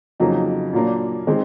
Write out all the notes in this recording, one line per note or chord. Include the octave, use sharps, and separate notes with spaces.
F2 C#3 F#3 A#3 D#4
A#2 F#3 A#3 D4
D#3 G#3 C4